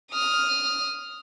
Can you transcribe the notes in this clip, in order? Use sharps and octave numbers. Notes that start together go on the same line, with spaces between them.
D#6 F6